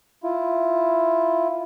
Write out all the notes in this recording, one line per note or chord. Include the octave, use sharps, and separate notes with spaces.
E4 F4